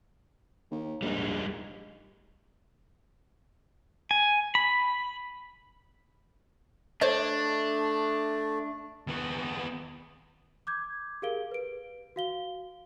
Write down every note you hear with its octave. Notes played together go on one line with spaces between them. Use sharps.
D#2
A#1 G3 G#3 D#4
G#5
B5
A3 D4 C5 C#5 D#5
D#2 B3
D6 G6 G#6
G4 G#4 A#4 F5 D7 G7
B4 D7
F#4 F5 G7